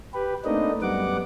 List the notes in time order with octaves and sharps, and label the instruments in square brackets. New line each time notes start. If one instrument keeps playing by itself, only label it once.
[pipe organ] G4 B4
A3 A#3 C4 D4 D#4 D#5
F#2 G3 B3 F#5 D6